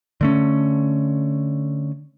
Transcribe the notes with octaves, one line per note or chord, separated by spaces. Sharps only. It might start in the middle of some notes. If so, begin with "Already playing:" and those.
D3 A3 C#4